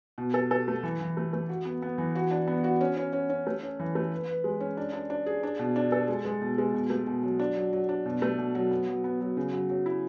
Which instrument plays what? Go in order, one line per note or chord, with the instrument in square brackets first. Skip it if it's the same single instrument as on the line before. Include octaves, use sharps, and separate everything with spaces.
[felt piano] B2
A4
A4
A3
E3
E3
A3
A3
F#4
B3
B3
E3
F#4
D4
B3
F#4
C#4
C#4
C#4
C#4
A3
C#4
E3
A3
B4
B4
G#3
C#4
D4
D4
D4
G#4
D4
B2
D4
A4
G#3
G#3
B2
G#3
B2
A3
B2
F#3
D4
F#3
F#3
D4
B2
A3
B2
F#3
B3
F#3
B3
F#3
C#3
F#3
F#3
E4